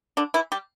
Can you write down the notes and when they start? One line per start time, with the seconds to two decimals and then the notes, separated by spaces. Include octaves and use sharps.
0.17 D3 D4
0.34 E3 E4
0.52 G3 G4